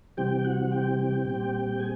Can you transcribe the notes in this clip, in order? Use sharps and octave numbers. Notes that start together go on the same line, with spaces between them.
C3 E3 G3 C4 G4 G5
F#4 F#5
G4 G5
A#2 G3 C4
G#4 G#5